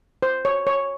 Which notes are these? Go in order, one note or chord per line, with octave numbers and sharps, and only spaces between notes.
C5
C#5
C#5